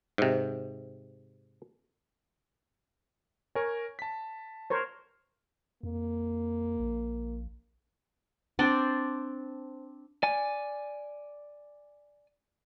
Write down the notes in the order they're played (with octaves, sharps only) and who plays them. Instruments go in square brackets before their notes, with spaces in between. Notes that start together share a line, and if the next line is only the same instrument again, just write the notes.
[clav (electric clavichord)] G#2 C3
[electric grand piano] A#4 G#5 [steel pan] C#5
[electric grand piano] A5 B6
[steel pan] A#4 C5 C#5
[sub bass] F2 [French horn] A#3
[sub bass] A#1
[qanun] C4 D4 C5 D5
[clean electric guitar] D5 G#5